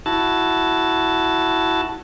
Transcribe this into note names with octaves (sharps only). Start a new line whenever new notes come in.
E4 F#4 A5